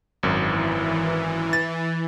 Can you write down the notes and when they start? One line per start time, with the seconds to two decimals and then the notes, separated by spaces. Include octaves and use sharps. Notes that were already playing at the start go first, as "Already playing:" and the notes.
0.23 G#1 F#2 E3
1.53 A6